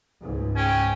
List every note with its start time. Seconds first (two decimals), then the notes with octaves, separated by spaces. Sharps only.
0.20 C#2 G#2
0.56 C#4 G5 G#5